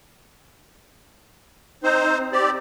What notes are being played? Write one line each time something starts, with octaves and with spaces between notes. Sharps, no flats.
C4 D#4 C5
C4 G4 D5